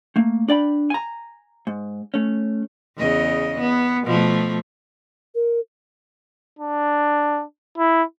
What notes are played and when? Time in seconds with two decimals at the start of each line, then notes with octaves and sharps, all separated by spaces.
0.16 A3 A#3
0.48 D4 D5 G5 B5
0.90 G#5 A#5
1.67 G#2
2.14 A3 C#4
2.97 E2 C#3 D#5
3.59 B3
4.05 B2 F3 A3
5.35 A#4
6.59 D4
7.78 E4